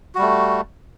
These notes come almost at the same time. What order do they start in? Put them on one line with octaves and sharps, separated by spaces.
F#4 G3 A3